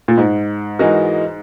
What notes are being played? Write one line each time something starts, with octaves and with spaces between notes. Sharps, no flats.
A#2
G#2
E3 G#3 D#4 F#4 A#4